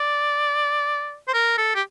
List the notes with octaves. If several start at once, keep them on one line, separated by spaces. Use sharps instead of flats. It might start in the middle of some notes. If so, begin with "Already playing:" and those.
Already playing: D5
C5
A#4
A4
G4